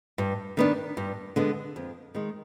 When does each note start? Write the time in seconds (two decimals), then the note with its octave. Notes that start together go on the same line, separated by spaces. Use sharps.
0.18 G2
0.57 D#3 B3 D4
0.97 G2
1.36 D3 G#3 B3
1.76 F2
2.15 D#3 G#3